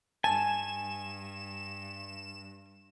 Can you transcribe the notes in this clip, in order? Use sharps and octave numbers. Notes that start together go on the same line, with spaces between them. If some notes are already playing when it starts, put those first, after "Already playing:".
G2 G#5 A5 E7